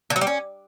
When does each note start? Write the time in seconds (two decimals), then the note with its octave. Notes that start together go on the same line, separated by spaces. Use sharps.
0.10 D3
0.16 F#3
0.21 G3
0.27 C#4